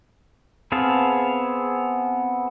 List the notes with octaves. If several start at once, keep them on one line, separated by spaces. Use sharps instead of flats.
B3 C4 G#4 F5 A5